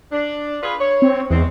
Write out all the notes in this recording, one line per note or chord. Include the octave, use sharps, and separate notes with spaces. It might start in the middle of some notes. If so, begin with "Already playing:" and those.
D4
F4 G#4 B4
C#5
C4
E2 G#3 C4